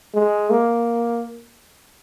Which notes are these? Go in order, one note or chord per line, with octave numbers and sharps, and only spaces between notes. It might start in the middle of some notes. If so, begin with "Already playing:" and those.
G#3
A#3